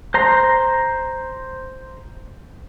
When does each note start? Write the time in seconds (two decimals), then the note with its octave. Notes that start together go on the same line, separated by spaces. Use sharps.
0.14 C5 A#5 C6